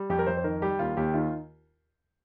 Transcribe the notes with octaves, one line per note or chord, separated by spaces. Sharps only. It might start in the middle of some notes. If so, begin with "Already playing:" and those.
Already playing: G3
F2 G4
A#4
F2 C5
C5
D#3 A#4
G3 G4
D#2 F4
D#2 G4
D#3 F4